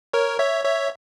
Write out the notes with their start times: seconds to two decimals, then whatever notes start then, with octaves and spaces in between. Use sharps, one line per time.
0.13 A#4 C#5
0.39 C#5 E5
0.65 C#5 E5